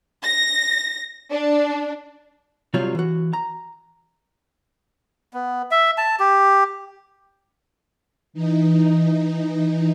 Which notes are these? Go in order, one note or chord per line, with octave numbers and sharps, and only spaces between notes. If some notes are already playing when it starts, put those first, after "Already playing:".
A#6
D4
C2 C3 F#3 G3 F4 C#5
E3 F#4
A#5
B3
E5
A5
G4
E3 D#4